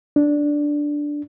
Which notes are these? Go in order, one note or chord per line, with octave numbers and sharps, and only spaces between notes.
D4